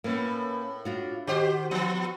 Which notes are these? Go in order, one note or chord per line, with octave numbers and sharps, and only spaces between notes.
A2 A#3 B3 C#4
D4 F4 F#4
D#3 F#4 G4 C5
F3 B3